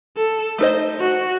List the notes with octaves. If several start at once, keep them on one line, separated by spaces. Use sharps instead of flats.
A4
A3 D#4 A4 C5 D#5
F#4